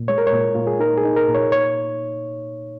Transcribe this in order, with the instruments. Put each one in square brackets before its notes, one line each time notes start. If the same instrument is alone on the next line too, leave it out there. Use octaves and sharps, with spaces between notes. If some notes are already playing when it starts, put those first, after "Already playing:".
Already playing: [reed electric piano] A#2
G#3 C#5
A#4
C#5
A#2
A#2 F4
G#4
D#4 A#4
G#4
D#4
A#4
A#2
C#5
C#5